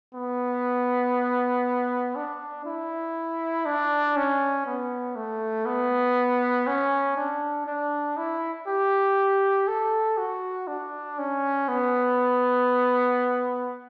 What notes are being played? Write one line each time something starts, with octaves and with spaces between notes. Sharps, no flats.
B3
D4
E4
D4
C#4
B3
A3
B3
C#4
D4
D4
E4
G4
A4
F#4
D4
C#4
B3